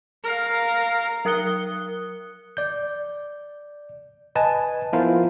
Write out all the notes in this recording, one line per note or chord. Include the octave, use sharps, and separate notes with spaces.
A#4 F5
F#3 A#4 D#6 F#6 C#7 G7
D5 G6
B4 D#5 G#5 A5
F3 B3 E4 F4 A#4 C5